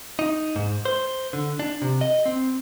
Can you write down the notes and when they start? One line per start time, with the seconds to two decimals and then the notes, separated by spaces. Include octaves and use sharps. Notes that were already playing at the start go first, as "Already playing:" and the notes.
0.19 D#4
0.56 G#2
0.85 C5
1.33 D3
1.59 D4
1.82 C3
2.01 D#5
2.26 C4